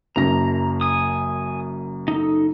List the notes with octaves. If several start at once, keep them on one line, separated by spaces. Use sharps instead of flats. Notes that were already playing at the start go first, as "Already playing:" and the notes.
F#1 F#2 A#5 A#6
G#5 D#6
D#4 A4